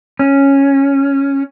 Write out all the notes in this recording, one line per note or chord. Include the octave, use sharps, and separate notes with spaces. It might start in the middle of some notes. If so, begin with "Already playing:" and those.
C#4